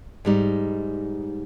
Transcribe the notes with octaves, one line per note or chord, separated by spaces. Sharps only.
G#2 G3 D#4